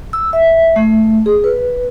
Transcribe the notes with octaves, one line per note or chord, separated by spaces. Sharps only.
E6
E5
A3
G#4
B4